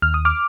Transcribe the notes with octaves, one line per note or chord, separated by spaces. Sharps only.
D#2 F6
D#6
D6 F6